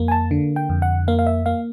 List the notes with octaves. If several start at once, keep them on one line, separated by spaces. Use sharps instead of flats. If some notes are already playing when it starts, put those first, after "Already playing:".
Already playing: F2 A#3
G#5
A5
D3
G5
F2
F#5
A#3 F5
F5
E5
A#3 F5